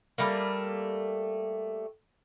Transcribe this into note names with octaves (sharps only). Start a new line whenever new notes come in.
G3 A3 A#3